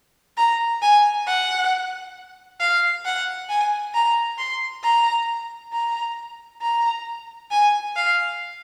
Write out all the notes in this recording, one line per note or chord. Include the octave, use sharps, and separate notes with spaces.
A#5
G#5
F#5
F5
F#5
G#5
A#5
C6
A#5
A#5
A#5
G#5
F5